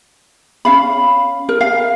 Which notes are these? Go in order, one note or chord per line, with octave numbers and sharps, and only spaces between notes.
C#4 F5 B5
A#4
F5